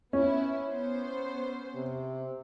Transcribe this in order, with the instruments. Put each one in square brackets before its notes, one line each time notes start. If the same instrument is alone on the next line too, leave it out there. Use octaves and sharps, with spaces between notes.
[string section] B3 E4 [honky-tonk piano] C#4
[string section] B3 C5
[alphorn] C3